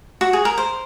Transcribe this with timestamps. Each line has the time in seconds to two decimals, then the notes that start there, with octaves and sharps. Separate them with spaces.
0.21 F#4
0.33 G#4
0.45 A#4
0.58 C5